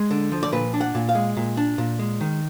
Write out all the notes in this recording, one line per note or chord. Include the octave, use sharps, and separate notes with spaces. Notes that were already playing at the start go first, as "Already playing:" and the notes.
Already playing: G#3 G#4
D3
F3
D5
A#2 B4
D4
F#5
A#2
F5
G#3
A#2
D4
A#2
G#3
D#3